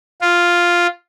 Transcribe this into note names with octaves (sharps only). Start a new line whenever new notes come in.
F4